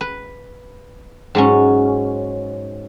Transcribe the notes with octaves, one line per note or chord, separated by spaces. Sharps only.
B4
G#2 F#3 C#4